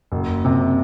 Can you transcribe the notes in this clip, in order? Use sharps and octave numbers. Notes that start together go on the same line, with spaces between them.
F#1
C3